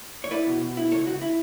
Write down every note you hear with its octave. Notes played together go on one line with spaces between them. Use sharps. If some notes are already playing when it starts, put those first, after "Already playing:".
C#5
E4 B4 D5
B2
B2
E4
C#2 A4 C#5
C#2 F#4
E4